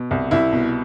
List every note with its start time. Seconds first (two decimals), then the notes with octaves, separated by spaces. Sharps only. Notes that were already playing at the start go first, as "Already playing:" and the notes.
Already playing: B2
0.11 C2
0.31 C2 E4
0.52 B2